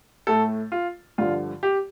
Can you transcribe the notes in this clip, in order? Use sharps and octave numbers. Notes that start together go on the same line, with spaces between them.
A2 A3 A4
F4
G2 D3 F3 F4
G4